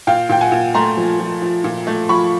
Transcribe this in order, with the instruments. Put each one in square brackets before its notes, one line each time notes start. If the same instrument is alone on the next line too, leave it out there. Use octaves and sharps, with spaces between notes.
[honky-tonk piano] A#2 F5 G5
A#2 G5
F#5 G#5
A#2
A3 A#5 C6
F3
F3
F3
A#2
A3
F3 B5 C#6